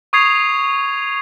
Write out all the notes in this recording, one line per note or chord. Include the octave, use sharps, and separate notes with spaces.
C#6 D#6 G#6 C7 F7